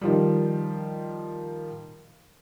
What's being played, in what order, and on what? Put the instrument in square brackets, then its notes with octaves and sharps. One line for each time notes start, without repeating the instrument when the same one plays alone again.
[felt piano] D#3 F3 G3